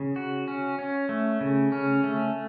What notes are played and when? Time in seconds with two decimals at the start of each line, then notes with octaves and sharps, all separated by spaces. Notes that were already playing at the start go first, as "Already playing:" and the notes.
Already playing: C#3
0.16 F#4
0.48 C#4
0.79 C#4
1.09 A3
1.41 C#3
1.72 C#4
2.04 A3